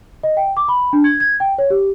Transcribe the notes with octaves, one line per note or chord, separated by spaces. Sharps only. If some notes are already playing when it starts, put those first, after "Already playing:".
D#5
G5
D6
B5
D4
G#6
G#6
G5
C#5
G4